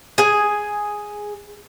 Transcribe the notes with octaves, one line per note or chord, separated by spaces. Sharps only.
G#4 G#5